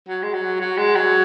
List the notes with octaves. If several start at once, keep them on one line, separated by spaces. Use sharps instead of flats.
F#3
G#3
F#3
F#3
G#3
F#3